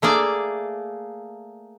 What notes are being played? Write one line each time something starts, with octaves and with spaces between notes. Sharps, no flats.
A3 A#3 G#4 D5